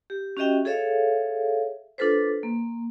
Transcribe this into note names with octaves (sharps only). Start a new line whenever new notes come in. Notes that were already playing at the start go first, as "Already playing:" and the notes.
G4
C#4 F#4 G4 D#5 E5 G5
G#4 A4 C#5 E5 F5
D4 F4 A4 B4 C5
A#3